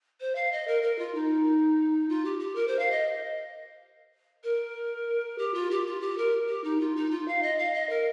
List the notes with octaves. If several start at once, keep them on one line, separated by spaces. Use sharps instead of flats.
C5
F5
D#5
A#4
A#4
F4
D#4
F4
G4
G4
A#4
C5
F5
D#5
A#4
G4
F4
G4
F4
G4
A#4
G4
D#4
F4
D#4
F4
F5
D#5
F5
D#5
A#4